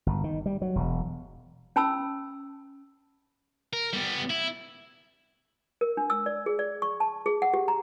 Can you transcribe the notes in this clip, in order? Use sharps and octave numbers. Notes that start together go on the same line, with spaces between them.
G1
D#3
G3
F#3
E1
C#4 A5 B5 E6
A#4
G3 B3
E4
A#4
D4
E6
D5
G#4
D5
C#6
A5
G#4
F#5
G4
A#5